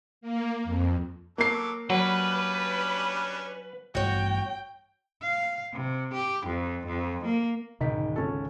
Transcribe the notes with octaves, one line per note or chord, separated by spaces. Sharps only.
A#3
F2
F#3 A#3 A4 D6 C7
F#3 G3 C#4 D4 B4
A1 G2 B3 F#4 C#5 G5
F5
C3
G4
F2
F2
A#3
G#1 C#2 B2 D3 D#3 B6
C#4 A4